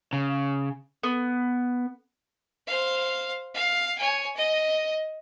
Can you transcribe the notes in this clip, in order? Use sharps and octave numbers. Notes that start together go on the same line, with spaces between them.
C#3
B3
C5 F5
F5
C#5 G#5
D#5